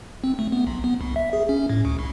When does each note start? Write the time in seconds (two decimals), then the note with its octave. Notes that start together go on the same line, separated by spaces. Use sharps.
0.24 C4
0.39 A3
0.52 B3
0.67 B1
0.84 B3
1.01 C2
1.16 E5
1.33 G#4
1.49 C#4
1.69 A2
1.85 D2
1.99 C2